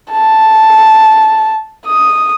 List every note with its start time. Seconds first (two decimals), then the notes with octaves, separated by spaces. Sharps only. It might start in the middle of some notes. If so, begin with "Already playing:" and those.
0.12 A5
1.87 D#6